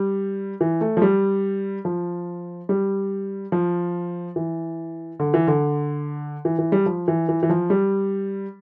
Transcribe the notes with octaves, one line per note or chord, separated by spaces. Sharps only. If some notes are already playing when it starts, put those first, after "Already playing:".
Already playing: G3
E3
A3
F3
G3
F3
G3
F3
E3
D3
E3
D3
E3
E3
G3
F3
E3
E3
E3
F3
G3